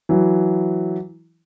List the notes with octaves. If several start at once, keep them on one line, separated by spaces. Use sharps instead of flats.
E3 F#3